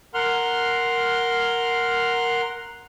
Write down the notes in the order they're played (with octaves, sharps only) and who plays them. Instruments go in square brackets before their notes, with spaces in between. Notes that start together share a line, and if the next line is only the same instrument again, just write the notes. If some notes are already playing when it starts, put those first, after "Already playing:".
[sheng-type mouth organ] A#4 F#5 C6 F6